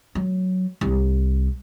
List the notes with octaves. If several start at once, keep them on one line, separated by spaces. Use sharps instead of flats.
F#3
C2